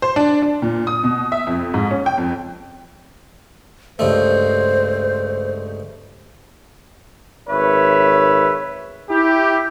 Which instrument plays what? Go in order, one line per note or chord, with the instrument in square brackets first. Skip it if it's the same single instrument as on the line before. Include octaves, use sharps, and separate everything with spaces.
[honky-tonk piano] C5
D4
D4
A#2
D#6
B2
E5
F2
G#2
C#4
G5
F2
[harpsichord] C#2 G2 A3 [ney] C5
[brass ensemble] G#1 B4 C#5 E5
E4 G4